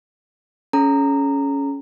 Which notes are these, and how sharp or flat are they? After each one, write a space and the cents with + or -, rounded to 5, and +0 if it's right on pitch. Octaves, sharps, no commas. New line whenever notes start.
C#4 +5 G#4 +40 A#5 -15